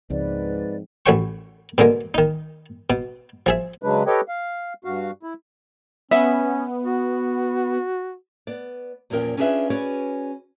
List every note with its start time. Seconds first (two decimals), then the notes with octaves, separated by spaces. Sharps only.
0.10 C#2 G#2 F3 C4 B4 D5
1.06 A1 A3 F#4 C#5 G5 C#6
1.78 B2 D3 G#3 A#3
2.14 D#3 D#4
2.90 B2
3.46 F3 G#4 E5
3.83 C#3 F#3 G#3 D4 B4
4.07 G4 A4 B4 C#5 D#5 G5
4.28 F5
4.85 G2 F#4 F5
5.23 E4
6.11 B3 C#4 E5
6.84 F#4
8.47 B3 D5
9.10 E2 A#2 F3 C#4 A#4 G5
9.37 C#4 D4 F4 G#4 B4 E5
9.70 C#4 F#4 G#4 B4 C#5 D5